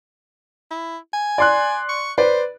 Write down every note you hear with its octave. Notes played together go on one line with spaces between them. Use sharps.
E4
G#5
D5 C6 F#6
C#6
B4 C5 D5